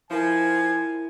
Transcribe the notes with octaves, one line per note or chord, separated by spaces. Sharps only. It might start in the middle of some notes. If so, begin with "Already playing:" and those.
F3 E4 A#4 G#5